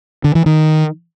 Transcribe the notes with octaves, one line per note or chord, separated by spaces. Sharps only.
D3
E3
D#3